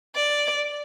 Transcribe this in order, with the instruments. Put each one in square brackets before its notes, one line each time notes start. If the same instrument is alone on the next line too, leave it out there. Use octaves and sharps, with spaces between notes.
[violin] D5